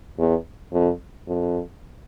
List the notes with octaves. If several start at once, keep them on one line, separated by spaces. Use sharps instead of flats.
E2
F2
F2